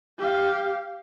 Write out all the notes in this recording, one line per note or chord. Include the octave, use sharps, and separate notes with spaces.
G4 F5